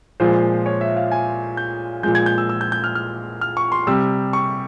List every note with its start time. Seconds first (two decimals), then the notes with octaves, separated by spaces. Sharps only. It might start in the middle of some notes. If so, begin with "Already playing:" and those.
0.20 A#2 F3 G#3 C5
0.66 C#5
0.81 E5
0.96 F5
1.12 G#5
1.57 G6
2.03 A#2 F3 G#3 G6
2.15 G#6
2.26 G6
2.38 E6
2.49 E6
2.61 G6
2.72 G6
2.84 F6
2.95 F6
3.41 F6
3.57 C#6
3.72 C6
3.87 C3 G3 E6
4.33 C#6